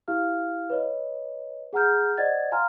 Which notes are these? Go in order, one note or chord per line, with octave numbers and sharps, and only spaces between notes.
E4 G4 F5 F6
B4 C#5 D#5
G#4 F#5 A#5 F6 G6
C5 D5 D#5 F#5 G#6 A6
F5 G#5 A#5 C6 F6